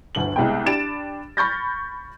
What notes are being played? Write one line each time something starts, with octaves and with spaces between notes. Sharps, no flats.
G1 D2 D3 F#7
C2 G#3 B3 G5
D4 G4 B5 A6 D7 E7
B5 C#6 F6 G6 A6 A#6